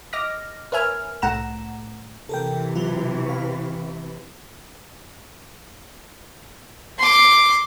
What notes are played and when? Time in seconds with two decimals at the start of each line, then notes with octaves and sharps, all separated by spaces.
0.13 D#5 D6 F6 A#6
0.72 A#4 B4 C#5 E5 G#5 F6
1.22 C2 A2 A3 F#5 A#5 E7
2.29 C3 E3 A4 A#4 G5
2.75 F#3 F4
3.26 F5 C#6
6.99 C6 D6